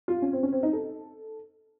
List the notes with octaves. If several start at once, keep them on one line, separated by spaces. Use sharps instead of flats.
F4
C#4
C4
C#4
C4
D#4
A4